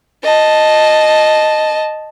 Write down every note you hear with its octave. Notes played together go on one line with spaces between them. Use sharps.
D#5 A5